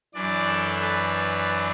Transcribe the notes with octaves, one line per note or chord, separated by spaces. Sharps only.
F#2 E3 D4 D5
A4
B4